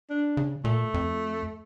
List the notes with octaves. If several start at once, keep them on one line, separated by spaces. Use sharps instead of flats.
D4
C#3
A#2 A3
F2